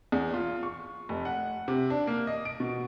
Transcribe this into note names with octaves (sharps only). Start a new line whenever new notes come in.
E2
F4
C#6
F1
F#5
C3
D4
A#3
D#5
D7
B2